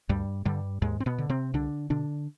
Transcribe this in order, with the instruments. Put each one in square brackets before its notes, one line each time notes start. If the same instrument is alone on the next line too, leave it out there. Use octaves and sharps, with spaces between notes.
[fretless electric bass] D2 G2 G3
G2 D3 G3
D#2 G#2 G#3
C4
B2 B3
D3
C3 C4
C2 D3 D4
B2 D3 D4